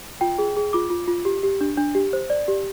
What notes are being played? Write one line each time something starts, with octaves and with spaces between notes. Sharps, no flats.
F4 G5
G#4
G#4
F4 D6
F4
F4
G4
G4
D4
D4
G4
C5
D5
G4